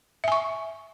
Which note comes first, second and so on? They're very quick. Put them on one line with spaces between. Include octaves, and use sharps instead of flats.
E5 G#5 C#6